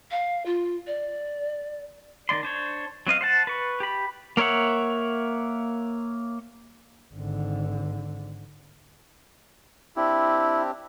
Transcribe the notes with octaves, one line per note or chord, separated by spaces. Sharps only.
F5
F4
D5
D#3 A#3 D5 C6
D4 C5 C#5
F#3 C4 D#5 F5
C5 F#5 A5
B4 C#6
G4 B5
A#3 A#4 C#5 E5 F#5
G#1 D3
C4 D4 E4 G4